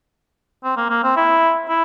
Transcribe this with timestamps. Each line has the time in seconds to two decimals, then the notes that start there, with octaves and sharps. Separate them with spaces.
0.64 C4
0.77 A#3
0.90 A#3
1.04 C4
1.17 E4
1.69 E4